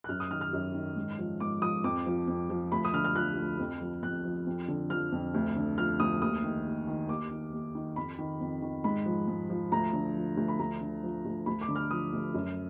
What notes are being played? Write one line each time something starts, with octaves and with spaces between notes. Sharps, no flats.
F#6
F#2 F6
D#6
D#3 F6
F6
F#2
D#3
G#2
F3
G#2 D6
F3 D#6
F2 D6
F3
F2
F3
D2 B5
D#6
D3 F6
F6
F3 F#6
D2
F2
F3
F2 F#6
F3
F2
D3
F3 F6
F2
D2
D3
F3 F6
D2 D#6
D#2 D#6
D#3
D#2
D#3
D#2 D6
D#3
D#2
D#3
F2 B5
D#3
F2
D#3
G#2 B5
F3
G#2
F3
D2 A#5
D3
F3
D2
B5
D2 A#5
D3
F3
D2
D2 B5
D6
D3
F6
F3 D#6
D2
F#2